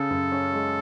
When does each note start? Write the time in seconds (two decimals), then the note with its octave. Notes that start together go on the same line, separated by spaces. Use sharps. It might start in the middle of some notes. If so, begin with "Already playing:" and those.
Already playing: C#3 A4
0.10 F#2
0.32 C#4
0.53 G#3